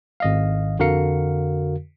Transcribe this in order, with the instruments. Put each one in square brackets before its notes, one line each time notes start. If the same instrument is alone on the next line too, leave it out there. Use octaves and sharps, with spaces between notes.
[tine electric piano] G#1 D#5 F5
F2 D3 F#4 A#4 F5 C#7